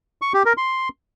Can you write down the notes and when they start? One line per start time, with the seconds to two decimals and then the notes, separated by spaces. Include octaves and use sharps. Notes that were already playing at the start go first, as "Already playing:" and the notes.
0.22 C#6
0.34 G4
0.45 A#4
0.57 C6